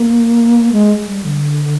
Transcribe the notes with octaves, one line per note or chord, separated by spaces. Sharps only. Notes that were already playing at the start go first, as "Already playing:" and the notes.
Already playing: A#3
G#3
G3
D3